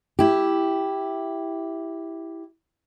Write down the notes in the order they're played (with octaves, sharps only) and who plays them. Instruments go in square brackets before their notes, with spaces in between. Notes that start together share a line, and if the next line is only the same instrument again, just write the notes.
[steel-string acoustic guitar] E4 G4